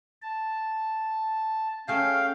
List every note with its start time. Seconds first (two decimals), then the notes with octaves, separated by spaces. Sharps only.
0.22 A5
1.88 A3 C#4 G#4 F5 G5